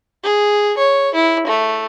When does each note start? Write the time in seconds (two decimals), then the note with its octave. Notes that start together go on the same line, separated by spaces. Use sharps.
0.24 G#4
0.78 C#5
1.14 E4
1.47 A3